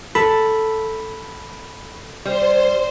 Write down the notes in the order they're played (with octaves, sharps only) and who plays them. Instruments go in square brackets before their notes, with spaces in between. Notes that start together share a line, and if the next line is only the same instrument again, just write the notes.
[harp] A4 [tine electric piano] B5
[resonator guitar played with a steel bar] G3 [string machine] C5